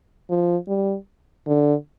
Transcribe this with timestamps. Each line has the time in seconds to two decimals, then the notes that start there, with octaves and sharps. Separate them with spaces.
0.30 F3
0.68 G3
1.47 D3